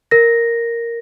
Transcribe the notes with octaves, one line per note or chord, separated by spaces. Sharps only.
A#4 A#6